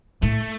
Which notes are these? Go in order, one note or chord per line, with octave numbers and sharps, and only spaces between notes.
A2 A3